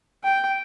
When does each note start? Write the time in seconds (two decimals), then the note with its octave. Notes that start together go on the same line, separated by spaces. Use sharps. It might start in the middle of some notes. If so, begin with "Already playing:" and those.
0.24 G5